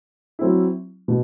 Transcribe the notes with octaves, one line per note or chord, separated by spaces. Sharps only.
F#3 C4 E4
B2